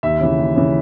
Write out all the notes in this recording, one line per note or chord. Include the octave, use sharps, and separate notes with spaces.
D#2 E5
C#3 E3
D#2
C#3 E3